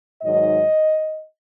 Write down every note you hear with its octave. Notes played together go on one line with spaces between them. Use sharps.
G#2 D#3 F#3 D#5